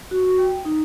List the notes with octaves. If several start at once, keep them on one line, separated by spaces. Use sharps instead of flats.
F#4
F#4
G5
D#4